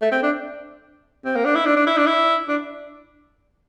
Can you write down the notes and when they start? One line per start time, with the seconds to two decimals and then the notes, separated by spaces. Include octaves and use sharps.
0.02 A3
0.12 C4
0.23 D4
1.25 C4
1.35 A#3
1.45 D4
1.55 E4
1.65 D4
1.76 D4
1.87 E4
1.97 D4
2.06 E4
2.48 D4